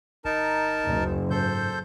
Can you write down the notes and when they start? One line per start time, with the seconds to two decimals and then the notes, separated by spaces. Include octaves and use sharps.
0.25 G1 D#4 A#4 A5
0.87 F#1 D2
1.30 G#2 A4 C5 G6